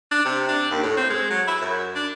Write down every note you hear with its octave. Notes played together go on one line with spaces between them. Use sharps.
D4
C3
D4
D#2
A2
C4
G#3
F#3
E4
F#2
D4